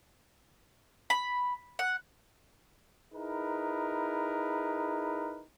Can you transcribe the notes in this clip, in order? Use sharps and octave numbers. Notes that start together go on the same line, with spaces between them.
B5
F#5
D#4 E4 G#4 A#4 B4